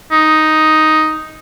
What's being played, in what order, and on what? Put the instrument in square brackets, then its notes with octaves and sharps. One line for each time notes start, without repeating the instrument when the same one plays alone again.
[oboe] D#4